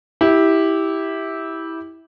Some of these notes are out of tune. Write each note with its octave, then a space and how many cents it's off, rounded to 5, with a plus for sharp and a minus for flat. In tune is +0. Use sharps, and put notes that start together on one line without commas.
E4 -15 G4 +0